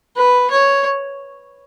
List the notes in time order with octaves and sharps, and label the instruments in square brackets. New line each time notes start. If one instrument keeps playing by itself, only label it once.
[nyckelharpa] B4
C#5